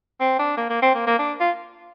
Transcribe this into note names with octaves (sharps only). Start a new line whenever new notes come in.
C4
D4
A#3
A#3
C4
A#3
A#3
D4
F4